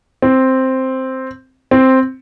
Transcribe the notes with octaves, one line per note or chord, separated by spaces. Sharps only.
C4
C4